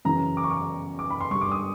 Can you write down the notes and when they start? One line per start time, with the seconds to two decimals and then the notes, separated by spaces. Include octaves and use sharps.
0.05 F#2 C#3 E3 A#5
0.37 D6
0.44 C#6
0.51 D6
0.99 D6
1.10 B5
1.21 C6
1.30 G2 D3 C#6
1.41 D6
1.51 D#6